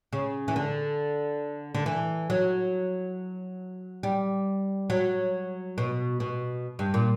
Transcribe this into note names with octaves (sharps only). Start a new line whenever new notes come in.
C#3
E3
D3
D3
E3
F#3
G3
F#3
B2
B2
G2
A#2